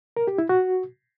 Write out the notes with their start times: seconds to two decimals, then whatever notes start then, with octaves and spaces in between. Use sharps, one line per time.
0.17 A#4
0.27 G4
0.38 E4
0.49 F#4